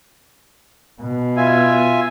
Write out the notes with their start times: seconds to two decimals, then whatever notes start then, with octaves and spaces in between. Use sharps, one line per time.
1.02 B2
1.37 F4 E5 G#5